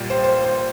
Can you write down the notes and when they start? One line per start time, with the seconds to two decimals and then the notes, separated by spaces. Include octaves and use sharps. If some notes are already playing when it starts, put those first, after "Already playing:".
Already playing: A#1 A#2 G3 G5
0.10 C5
0.24 C5
0.44 C5